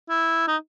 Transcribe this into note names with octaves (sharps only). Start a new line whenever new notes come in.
E4
D#4